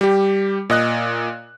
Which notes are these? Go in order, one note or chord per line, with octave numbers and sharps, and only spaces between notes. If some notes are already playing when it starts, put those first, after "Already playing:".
G3 G4
A#2 D#5 F#6